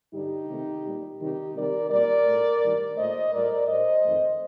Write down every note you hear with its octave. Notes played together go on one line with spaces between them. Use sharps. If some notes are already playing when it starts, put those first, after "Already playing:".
G2 D3 G3 D#4 G4
C3 D#3 A3
A#2 G3
C3 D#3 G3 D#4 G4
C3 D#3 G3 A#4 D5
A#2 G3 A#4 D5
A2 A3
G2 D#3 G3
A#2 A3 C5 D#5
A2 G3 A#4 D5
A2 G3 C5 D#5
F2 D#3 A3